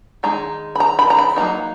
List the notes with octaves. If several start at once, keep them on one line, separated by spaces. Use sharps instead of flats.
D#3 G#3 D#4 A#5
B5
A#5
B5
A#5
B5
F#3 A#3 D#4 A#5